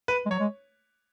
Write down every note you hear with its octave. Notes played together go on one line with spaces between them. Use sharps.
B4
G#3
F#3 C#5
G#3